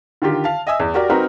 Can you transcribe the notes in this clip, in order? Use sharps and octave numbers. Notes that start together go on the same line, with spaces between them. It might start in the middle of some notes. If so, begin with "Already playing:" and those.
D3 D#3 F4 G4
F5 A5
D#5 E5 G#5 D#6 E6
E2
F#4 G4 A#4 D5
C4 D#4 F#4 A#4 B4